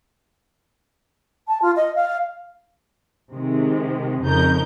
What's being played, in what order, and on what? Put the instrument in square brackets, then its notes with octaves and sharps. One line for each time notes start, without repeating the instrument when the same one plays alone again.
[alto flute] A5
F4
D#5
F5
[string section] C3 D#3 G#3
F2 C#3 D#4 A#4 G6